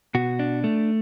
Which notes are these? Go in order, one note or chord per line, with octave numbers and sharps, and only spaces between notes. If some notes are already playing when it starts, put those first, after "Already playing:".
B2 F#4
D4
A3